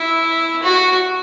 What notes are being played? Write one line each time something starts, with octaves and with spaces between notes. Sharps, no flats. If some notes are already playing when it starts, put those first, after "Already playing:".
Already playing: E4
F#4